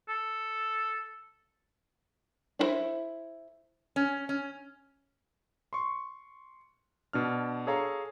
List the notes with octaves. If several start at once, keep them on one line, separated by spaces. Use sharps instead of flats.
A4
D4 E4 A4 C5 E5
C#4
C#4
C6 C#6
B2 D4 F6
G#4 A4 C#5 F5 A#5